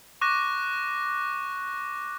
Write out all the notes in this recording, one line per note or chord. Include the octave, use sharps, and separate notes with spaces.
C#6 D6 F#6 A#6